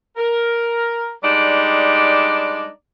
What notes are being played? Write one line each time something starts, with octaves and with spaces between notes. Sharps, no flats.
A#4
G3 G#3 D4 D#4 D5